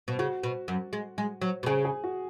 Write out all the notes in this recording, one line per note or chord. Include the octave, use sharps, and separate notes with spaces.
B2
C#3 F#4
B2
F#2
G#3
G#3
F#3
B2
C#3 G#4
G#4
F#4